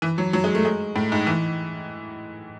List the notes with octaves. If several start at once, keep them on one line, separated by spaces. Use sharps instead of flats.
E3
F#3
F#3
G#3
A3
G#3
A2
G#2
E3